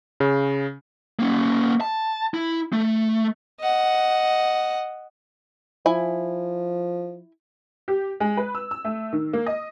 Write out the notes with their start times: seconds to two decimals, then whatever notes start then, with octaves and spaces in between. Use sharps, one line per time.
0.20 C#3
1.19 A#3 C#4
1.81 A5
2.34 E4
2.73 A3
3.60 D#5 F#5
5.86 F3 E4 G#5
7.88 G4
8.20 G#3
8.37 B4
8.55 E6
8.71 E6
8.85 A3
9.13 D#3
9.33 A#3
9.46 D#5